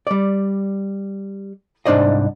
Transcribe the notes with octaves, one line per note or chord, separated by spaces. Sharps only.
G3 D5
C2 G#2 D4 C5 D5 D#5